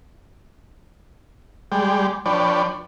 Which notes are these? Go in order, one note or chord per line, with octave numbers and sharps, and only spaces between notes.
G3 G#3 D5 G5
F3 D4 B4 C#5 D5 G5